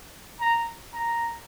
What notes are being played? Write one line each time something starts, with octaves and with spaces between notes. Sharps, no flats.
A#5
A#5